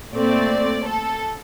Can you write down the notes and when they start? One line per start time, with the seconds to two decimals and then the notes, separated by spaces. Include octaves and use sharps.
0.15 A#2 A3 C4 D5
0.87 A4